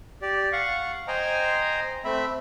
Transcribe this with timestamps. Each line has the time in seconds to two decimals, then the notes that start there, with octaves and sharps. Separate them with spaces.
0.22 G4 D5
0.53 F5 F#5 C#6
1.08 C5 D#5 G5 G#5 A#5
2.05 A3 C4 E5 B5